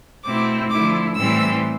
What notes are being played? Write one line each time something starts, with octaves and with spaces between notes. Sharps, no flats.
B2 A3 C4 E4 D6
D3 F3 A3 E4 D6
A2 E3 G3 C4 E6